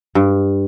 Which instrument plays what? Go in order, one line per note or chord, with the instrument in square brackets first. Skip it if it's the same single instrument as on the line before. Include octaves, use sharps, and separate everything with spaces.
[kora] G2